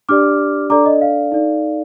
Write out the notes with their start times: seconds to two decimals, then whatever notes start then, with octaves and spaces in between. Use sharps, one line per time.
0.09 D4 G4 D5 D6 F6
0.70 D4 A4 D5 A#5 D6
0.86 D#5
1.01 F5
1.32 D#4 A4 D5